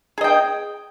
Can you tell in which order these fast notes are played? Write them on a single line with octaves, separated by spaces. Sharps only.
G#4 D#5 G5